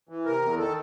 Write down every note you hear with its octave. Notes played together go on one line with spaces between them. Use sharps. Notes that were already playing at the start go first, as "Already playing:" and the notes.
E3
C3 A#4
E2
D#3 A4